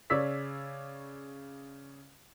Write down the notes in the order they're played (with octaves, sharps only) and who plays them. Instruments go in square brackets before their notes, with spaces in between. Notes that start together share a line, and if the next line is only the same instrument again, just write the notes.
[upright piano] C#3 C#5 D5 E6 B6